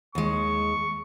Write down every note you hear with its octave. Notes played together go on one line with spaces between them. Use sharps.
D#2 G#3 C#6